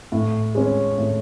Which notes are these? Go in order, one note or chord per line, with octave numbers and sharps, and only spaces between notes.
A2
G#3 C#4
A2